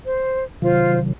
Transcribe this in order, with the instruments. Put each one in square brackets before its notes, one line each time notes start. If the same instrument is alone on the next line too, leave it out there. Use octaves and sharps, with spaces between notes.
[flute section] C5
[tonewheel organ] C3 D#3 F#3 [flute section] F4 C5 F5